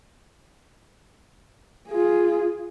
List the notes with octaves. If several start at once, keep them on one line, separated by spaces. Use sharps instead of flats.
F4 G#4